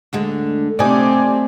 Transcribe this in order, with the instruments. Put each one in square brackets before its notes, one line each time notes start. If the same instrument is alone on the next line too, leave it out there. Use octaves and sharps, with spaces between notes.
[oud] D2 D3 G#3
[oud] C3 D#4 [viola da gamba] A3 C4 [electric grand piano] D5 G#5 D6